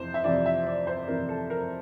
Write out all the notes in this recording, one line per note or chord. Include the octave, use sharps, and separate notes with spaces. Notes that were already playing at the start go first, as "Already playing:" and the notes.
Already playing: F2 C3 E3 C5
E5
F2 C3 E3 D5
E5
D5
C5
F2 C3 E3 A#4
A4
A#4